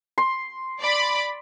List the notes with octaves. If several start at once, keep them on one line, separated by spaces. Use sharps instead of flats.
C6
D5 B5